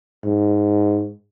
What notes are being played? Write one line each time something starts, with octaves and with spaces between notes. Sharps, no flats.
G#2